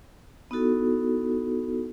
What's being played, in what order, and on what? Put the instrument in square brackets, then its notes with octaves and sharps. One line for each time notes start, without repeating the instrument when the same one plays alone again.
[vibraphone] B3 D#4 E4 F#4 A4